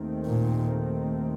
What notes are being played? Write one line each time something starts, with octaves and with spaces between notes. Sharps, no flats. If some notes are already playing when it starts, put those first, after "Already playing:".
Already playing: D#2 D#3 A3 C4
A#2